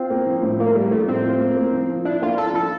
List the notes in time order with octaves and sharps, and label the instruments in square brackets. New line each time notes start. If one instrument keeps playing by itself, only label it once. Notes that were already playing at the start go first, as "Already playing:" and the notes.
Already playing: [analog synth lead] C4 [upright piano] F4
[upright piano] A#3
F3
A2
[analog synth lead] A#3 [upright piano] F4
[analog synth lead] G3 [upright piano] A#3
[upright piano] F3 [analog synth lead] A3
[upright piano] A2 [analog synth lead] C4
[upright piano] F4
A#3
A#3
F3
F3
[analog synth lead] D4 [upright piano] E4
[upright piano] A#3 [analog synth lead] F4
[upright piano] F3 [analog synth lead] A4
[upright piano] F3 [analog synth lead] A4